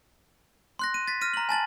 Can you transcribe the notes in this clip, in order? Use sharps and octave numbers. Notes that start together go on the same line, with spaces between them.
C6 F#6 A#6
D#7
A6 B6
F6 A#6 D#7
A#5 F#7
G#5 A5 A6 F#7